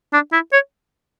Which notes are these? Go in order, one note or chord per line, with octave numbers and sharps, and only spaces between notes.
D4
E4
C#5